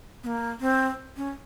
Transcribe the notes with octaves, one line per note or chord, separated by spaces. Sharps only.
B3
A#3
C4
C#4